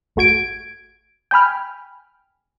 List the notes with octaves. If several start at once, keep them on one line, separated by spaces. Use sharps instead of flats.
G#1 A3 F#4 G#6 D7
G5 G#5 B5 F6